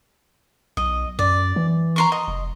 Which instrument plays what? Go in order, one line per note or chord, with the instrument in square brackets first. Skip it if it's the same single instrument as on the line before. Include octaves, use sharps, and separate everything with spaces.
[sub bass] B1 [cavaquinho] D#5
[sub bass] F#2 [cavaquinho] D5
[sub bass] E3
[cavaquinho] A#5 C6 C#6
D#5
[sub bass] F1